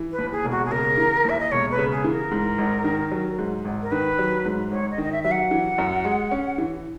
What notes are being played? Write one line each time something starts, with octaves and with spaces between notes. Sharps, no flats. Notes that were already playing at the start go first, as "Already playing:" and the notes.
Already playing: E3
B4
D#2
G#4
E1
F#4
G#4
C#3 A#4
E3
D#2 E5
D#5
E1 C#5
B4
C#3
G#4
E3
A#4
G#2
G#1
D#3
F#3
G#2
G#1
A#4
D#3 B4
F#3
G#2
G#1 C#5
D#5
D#3
D#5
E5
F#3 E5
F#5
E3
F#2
G#3
C#4
E3